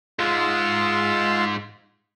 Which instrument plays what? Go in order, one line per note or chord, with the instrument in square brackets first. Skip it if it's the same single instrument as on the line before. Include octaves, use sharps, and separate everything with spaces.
[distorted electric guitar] G#2 G#3 [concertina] F4 C6 E6